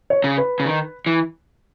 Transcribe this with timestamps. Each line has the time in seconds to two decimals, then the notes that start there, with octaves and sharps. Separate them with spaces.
0.10 C#5
0.24 C#3
0.38 B4
0.60 C#3
0.66 D#3
1.06 E3